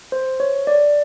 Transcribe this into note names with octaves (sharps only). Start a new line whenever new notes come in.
C5
C#5
D5